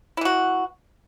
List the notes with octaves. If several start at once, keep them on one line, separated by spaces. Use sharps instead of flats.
E3 E4 F#4